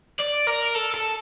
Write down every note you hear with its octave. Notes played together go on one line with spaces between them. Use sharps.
D5
A#4
A4
A4